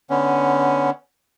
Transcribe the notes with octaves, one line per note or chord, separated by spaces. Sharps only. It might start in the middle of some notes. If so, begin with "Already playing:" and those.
D3 B3 C#4